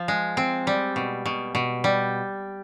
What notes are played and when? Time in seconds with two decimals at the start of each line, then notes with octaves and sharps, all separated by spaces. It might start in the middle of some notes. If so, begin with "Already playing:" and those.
Already playing: F3
0.08 G#3
0.37 C4
0.67 G3
0.96 B2
1.26 B2
1.55 B2
1.84 G3